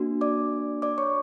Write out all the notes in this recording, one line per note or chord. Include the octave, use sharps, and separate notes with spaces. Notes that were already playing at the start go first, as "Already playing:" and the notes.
Already playing: A#3 D4 F#4
D5 D6
D5 D6
C#5 C#6